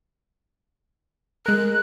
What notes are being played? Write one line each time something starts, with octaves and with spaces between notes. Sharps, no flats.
G#3 A#4 F#6